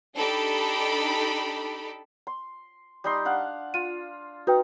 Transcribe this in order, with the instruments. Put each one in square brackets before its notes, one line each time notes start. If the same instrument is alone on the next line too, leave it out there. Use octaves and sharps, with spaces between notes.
[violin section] D4 D#4 G4 A4 B5
[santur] C6
G3 D#4 C6
D4 F5 F#5
[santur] F4 [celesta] D#7
[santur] D#4 [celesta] F#4 B4 G5